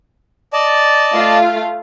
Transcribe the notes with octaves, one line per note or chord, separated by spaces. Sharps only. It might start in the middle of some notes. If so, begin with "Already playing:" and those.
D5 D#5 A5
A3 F4 F5